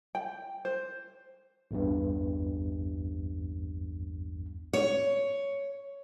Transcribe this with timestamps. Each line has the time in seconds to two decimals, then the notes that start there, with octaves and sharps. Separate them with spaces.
0.15 G5
0.65 C5
1.71 A1 E2 G2
4.73 C#5